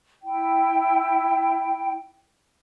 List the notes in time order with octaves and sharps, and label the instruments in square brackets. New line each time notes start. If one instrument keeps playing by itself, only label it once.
[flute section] E4 G5